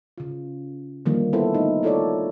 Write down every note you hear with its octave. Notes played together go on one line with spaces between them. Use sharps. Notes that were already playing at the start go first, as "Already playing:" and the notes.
C#3 F4
D3 D#3 F3 G3 A#3 D#4
B3 E4 A4 C5
A3 D#4
E4 F4 A4 C#5 D5